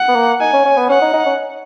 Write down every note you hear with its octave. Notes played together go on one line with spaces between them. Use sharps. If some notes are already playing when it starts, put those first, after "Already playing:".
Already playing: F#5
B3
A#3
D#4 G#5
C#4
C#4
B3
C#4 F#5
D#4
D#4
C#4